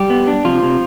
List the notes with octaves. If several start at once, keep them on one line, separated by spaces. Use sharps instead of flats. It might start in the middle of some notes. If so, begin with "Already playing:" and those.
Already playing: G3 G4
B3
D4
C3 F3 F4
C3